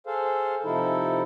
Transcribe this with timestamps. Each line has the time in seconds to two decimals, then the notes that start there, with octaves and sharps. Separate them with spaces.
0.07 G#4 A4 C5 F5
0.64 C3 F3 D#4 E4 A4